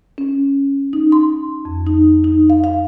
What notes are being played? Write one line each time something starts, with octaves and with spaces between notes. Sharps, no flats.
C#4
D#4
C6
F2
D#4
D#4
F5
F5